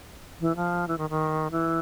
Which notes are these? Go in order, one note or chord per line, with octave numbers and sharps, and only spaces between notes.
E3
F3
E3
D#3
D#3
E3